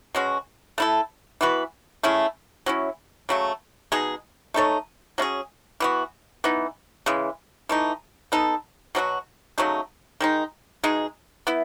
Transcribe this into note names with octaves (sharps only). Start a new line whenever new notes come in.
B2 G#3 C#4 F#4
A3 E4 A4
E3 B3 F#4 B4
A3 C#4 E4 G#4
F#3 C#4 E4
C#3 F#3 A3
B2 G#3 D#4 G#4
A3 D#4 A4 C#5
F#3 A3 C#4 G#4
E3 B3 F#4
E3 B3 D#4
C#3 E3 G#3
E3 A3 D#4
B3 D#4 A4
B2 F#3 C#4 F#4
C#3 F#3 A3 D#4
D#3 G#3 D#4
B2 G#3 D#4 G#4
B3 E4